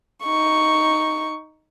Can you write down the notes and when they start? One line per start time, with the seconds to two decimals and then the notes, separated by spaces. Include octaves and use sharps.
0.24 D#4 C#6